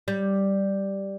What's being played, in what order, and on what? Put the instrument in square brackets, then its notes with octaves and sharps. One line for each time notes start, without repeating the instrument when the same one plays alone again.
[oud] G3